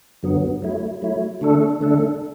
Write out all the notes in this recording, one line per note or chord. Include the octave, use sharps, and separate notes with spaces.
F#2 D3 F#3 B3
F#3 A3 E4
F#3 A3 E4
D3 A3 D4 A4
D3 A3 D4 A4